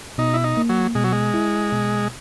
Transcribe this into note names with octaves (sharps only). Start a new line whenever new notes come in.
B2 D#4
E4
D#4
A#3
F#3
B2 G#3
F#3
G#3
E4
B2